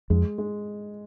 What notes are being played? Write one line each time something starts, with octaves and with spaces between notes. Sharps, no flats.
F2 G#3
G#3